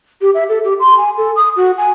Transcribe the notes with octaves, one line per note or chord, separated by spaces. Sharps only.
G4
E5
A4
G4
C6
G#5
A4
D#6
F#4
G#5